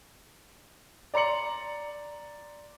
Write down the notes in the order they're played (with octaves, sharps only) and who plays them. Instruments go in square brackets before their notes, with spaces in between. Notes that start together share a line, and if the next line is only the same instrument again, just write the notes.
[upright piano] D5 A#5 C6 C#7 F#7